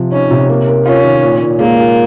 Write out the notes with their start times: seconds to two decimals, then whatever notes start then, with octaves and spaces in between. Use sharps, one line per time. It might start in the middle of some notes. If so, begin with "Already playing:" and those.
Already playing: C3 F3
0.12 C#4 D#4
0.31 C3
0.49 A#3
0.68 A#4
0.86 C#4 F4
1.04 D#3
1.23 A#2
1.42 A#2
1.60 G#3 A#3
1.78 A#2